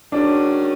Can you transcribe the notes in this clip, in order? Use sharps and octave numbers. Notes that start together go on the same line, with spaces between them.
D#3 G#3 C#4 D4 F#4